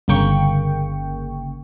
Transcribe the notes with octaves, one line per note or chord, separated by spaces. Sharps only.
G1 C#3 A#3 G5 C#6